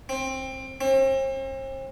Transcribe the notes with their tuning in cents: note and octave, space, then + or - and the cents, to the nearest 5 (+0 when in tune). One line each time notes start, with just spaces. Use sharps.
C4 +15
C4 +40